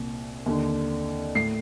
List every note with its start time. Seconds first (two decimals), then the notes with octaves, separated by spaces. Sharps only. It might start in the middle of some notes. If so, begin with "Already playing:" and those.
Already playing: C2 A#2
0.46 D#2 D3
1.35 A2 C7